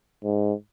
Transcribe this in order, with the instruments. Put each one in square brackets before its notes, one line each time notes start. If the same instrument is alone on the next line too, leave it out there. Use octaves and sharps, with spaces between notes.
[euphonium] G#2